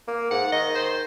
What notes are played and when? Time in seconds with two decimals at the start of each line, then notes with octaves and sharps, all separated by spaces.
0.08 A#3
0.31 G#2 F#5
0.52 D#3 D#5
0.75 C5